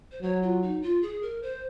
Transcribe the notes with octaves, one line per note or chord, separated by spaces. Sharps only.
C5
F#3 C#5
F4
D#4
F4
G#4
A#4
C5